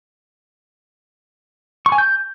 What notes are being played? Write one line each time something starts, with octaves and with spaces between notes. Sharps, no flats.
C#6
G#5
G6